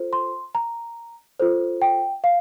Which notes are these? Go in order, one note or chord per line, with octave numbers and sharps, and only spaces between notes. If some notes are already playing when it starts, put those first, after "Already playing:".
Already playing: F4 A4 C5
C6
A#5
F4 A4 C5
G5
F5